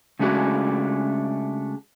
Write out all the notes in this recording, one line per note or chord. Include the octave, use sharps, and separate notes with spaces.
C#3 G#3 A3 D4 F#4 G#4